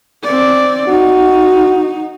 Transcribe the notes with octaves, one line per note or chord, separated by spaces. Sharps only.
C4 D5
D#4 F#4